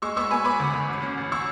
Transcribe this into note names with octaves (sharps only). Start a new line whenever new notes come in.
G#3 C#6 E6
B3 C#6 E6
B3 G#5 B5
B3 B5 D6
D2
D2
A1
C#4
A1
C#6 E6